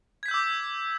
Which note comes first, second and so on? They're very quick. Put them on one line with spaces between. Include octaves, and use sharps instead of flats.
G#6 B6 G6 E6 D6